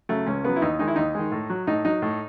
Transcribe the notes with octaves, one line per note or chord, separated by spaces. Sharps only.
C#3 F#3 A3
C#2 C#4
C#3 F#3 B3
E4
D#2 D#4
D#3 G#3 D#4
E4
D#2 D#4
D#3 G#3
A2
F#3
A2 D#4
F#3 D#4
A2